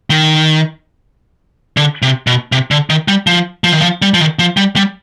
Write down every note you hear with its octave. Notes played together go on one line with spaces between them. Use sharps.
D#3
D3
C3
B2
C3
D3
D#3
G3
F3
F3
D#3
F3
G3
F3
D#3
F3
G3
G3